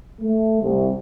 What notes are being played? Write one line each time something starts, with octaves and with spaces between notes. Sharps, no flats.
A3
C2